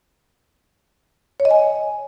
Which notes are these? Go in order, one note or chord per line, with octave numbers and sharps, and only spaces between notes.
C#5
D#5
G#5